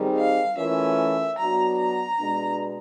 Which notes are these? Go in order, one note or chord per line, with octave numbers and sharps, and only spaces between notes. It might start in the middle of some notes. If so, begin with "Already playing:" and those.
Already playing: D#3 G3 C4 D#4 G#4
F5
E3 A3 C#4 F4 A#4 E5
F#3 B3 D4 F#4 A#5
A#5
B2 G#3 B3 D4